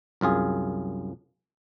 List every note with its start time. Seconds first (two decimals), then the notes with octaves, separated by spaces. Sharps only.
0.21 C2 F#2 F4 G#4